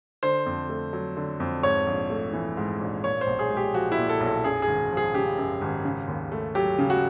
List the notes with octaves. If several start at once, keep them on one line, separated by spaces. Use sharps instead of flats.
D3 C5
F2
A3
F#3
D3
F2
G#2 C#5
A#1
A3
E3
G#2
A#1
A#2 C#5
C5
B1
G#4
G#3
G4
F3 F#4
E4
A#2
A4
B1
A4
F#2 G#4
G#4
G#1
F3
G#4
C#3 G4
F#2
G#1
C#3
D#2
A3
F#3 G4
C#3
F#4